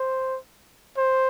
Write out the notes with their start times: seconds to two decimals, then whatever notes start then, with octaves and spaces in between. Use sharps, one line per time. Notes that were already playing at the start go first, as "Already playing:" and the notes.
Already playing: C5
0.97 C5